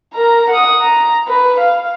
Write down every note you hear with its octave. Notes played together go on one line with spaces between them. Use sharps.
A#4 A#5
F#5 D#6
A#5
B4
F5